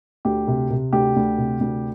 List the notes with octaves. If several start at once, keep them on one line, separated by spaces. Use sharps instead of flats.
D2 G4
C3
C3
D2 G4
D2
C3
D2